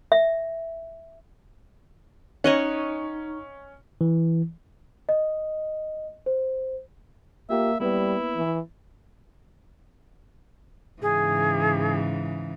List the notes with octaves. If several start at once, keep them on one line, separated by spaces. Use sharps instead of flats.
E5
C#4 D#4 C#5 D#5 F#5 A#5
E3
D#5
C5
A#3 F4 G4 E5
G3 A#3 B3 E4 B4
E3
G#2 C#3 E3 G#4